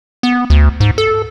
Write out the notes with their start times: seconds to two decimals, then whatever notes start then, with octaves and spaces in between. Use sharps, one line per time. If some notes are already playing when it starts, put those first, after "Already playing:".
0.23 B3
0.50 D2
0.80 G#2
0.98 A4